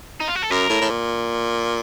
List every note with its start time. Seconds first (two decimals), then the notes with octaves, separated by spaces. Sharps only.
0.20 D#4
0.28 F4
0.35 F#4
0.42 A4
0.51 F#2 A#4
0.69 A2
0.81 A2
0.90 A#2